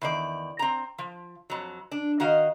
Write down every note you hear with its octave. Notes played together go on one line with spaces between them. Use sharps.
E2 D#3 D5
C4 A#5
F3
F2 F#3
D4
D#3 F#4 D#5 F5